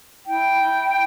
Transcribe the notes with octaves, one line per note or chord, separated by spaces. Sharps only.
E4 G5
E4